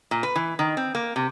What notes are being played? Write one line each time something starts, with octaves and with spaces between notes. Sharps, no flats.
A#2
B4
E3
D#3
C4
A#3
C3